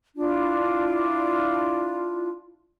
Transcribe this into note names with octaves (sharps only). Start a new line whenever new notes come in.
D4 E4 F4